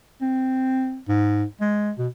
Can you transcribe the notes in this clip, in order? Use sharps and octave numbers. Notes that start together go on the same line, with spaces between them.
C4
G#2
G#3
B2